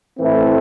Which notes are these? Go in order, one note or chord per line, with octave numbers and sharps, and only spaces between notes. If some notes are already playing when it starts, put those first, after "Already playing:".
A2 E3 A3 C4 E4